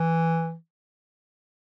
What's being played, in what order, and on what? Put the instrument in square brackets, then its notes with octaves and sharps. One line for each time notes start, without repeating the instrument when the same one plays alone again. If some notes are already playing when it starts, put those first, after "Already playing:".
Already playing: [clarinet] E3